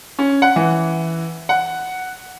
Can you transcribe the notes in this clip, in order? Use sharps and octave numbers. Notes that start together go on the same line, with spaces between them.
C#4
F#5
E3
F#5